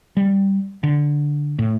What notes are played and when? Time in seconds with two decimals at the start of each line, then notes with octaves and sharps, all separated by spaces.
0.17 G3
0.83 D3
1.59 A2